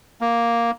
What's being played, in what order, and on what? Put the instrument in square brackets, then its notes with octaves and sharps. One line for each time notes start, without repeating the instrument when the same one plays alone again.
[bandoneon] A#3